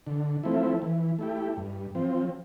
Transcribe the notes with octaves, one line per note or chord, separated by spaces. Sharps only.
D3
F3 A3 C4 E4
E3
A3 E4 G4
G2
F3 C4